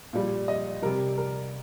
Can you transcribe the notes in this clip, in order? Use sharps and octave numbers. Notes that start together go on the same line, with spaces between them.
A#2 G3
D#5
C3 G3 A#4
A#4